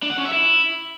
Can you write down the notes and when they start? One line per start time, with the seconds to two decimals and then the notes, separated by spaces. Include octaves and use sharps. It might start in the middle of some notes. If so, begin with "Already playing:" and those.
0.03 D4
0.10 F#5
0.18 C#4
0.25 E5
0.33 E4